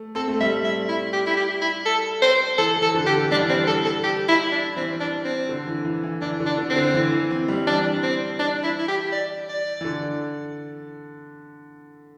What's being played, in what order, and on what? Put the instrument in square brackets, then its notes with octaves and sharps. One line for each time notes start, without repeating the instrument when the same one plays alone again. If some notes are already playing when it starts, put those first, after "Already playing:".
Already playing: [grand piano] A3
[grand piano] C4 [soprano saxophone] A4
[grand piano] A3
[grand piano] G3 [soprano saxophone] E5
[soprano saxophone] E5
E4
G4
E4
G4
E4
A4
C5
[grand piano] E3 [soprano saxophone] A4
[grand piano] E3
[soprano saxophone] A4
[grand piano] D3
[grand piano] D3 [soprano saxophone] G4
[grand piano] E3
[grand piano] G3 [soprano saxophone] D4
[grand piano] E3
[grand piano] G3 [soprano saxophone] C4
[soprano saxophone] A4
A4
G4
E4
D4
[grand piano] E3 [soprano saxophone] C4
[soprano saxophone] D4
C4
[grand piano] D3
E3
E3
E3
[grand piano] E3 [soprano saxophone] D4
[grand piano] D3
[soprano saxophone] D4
[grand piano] D3
[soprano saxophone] C4
[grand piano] D3
E3
E3
C4
G3
[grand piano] E3 [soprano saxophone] D4
[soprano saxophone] C4
D4
E4
E4
G4
D5
D5
[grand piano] E3
D3